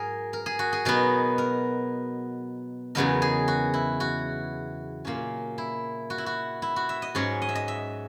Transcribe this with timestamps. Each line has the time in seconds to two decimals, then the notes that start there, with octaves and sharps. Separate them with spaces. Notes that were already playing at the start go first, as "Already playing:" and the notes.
Already playing: G#2 F#3 G#4 A#4
0.33 A#4
0.46 G#4
0.59 F#4
0.73 G#4
0.85 B2 F#3 B3 D#4 A#4
1.38 A#4
2.95 E2 C#3 F#3 B3 D#4 A#4
3.22 G#4
3.48 F#4
3.74 E4
4.00 F#4
5.05 A#2 A#3 C#4
5.58 E4
6.10 F#4
6.18 E4
6.26 F#4
6.62 E4
6.76 F#4
6.89 E5
7.02 D#5
7.15 G#2 F#3 C#4 C#5
7.42 D#5
7.49 E5
7.55 D#5
7.68 E5